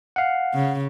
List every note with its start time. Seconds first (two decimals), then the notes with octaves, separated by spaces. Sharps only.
0.16 F5 F#5
0.54 C#3